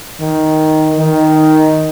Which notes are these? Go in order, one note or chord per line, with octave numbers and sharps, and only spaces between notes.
D#3
D#3